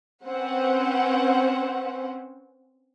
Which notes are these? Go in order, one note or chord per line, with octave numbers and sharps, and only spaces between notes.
C4 C#4 B4 C5 F#5